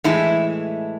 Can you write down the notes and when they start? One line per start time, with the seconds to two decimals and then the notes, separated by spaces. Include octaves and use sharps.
0.04 A2 E3 G#3 E4